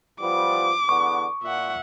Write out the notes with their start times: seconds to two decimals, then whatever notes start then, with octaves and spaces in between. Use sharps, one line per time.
0.21 F3 G3 B3 D6
0.89 E2 D3 B3 C#6
1.43 A#2 E5 F#5